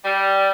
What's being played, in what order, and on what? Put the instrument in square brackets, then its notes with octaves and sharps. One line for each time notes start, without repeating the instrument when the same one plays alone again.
[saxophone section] G3